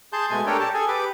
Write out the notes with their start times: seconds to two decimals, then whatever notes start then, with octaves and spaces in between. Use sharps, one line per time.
0.13 G#4 A5 C6 G6
0.31 B2 G#3 A3 G#5
0.46 D4 G4 A4 A#4 C#5 G5
0.60 G4 A5
0.74 G#4 A4 G#5
0.88 G4 B4 D6